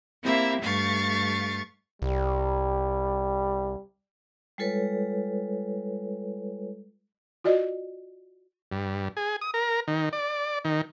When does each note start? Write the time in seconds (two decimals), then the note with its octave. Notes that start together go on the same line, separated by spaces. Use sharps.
0.22 A#3 C4 E4 G4 E5
0.61 G2 A3 F5 C#6 A6
2.02 C2 G3
4.58 G3 G#3 F4 A4 B4 C#5
7.44 F4 F#4 D5 D#5
8.72 G2
9.17 G#4
9.41 D#6
9.54 A#4
9.88 D#3
10.13 D5
10.65 D#3